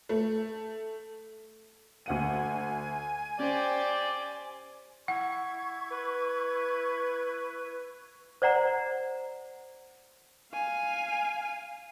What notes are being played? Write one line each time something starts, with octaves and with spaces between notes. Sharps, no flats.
A3
D2 F#5 G#5 D#7
C#4 G4 C5 D5
E4 F#5 C#6 G#6
B4
C5 D5 F#5 A#5
F5 G#5